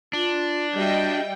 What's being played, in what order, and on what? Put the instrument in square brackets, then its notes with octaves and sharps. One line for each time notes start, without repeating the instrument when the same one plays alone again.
[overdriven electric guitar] D4 [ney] F4
[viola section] G3 G5 [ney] F#4 [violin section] D#5 E5